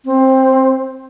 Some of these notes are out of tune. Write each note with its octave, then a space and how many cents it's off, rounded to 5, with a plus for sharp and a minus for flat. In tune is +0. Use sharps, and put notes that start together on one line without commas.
C4 +15